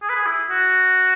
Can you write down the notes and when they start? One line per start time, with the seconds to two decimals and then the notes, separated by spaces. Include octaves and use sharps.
0.02 G#4
0.09 B4
0.16 G#4
0.26 E4
0.50 F#4